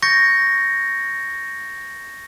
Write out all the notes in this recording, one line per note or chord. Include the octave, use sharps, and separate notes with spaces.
C#6 G6 A6 A#6 C#7